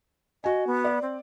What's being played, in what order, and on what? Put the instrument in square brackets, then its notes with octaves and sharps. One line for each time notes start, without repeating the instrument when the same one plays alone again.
[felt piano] F#4 G#5 [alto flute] D#5
[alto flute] B3
[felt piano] D5
[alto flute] C4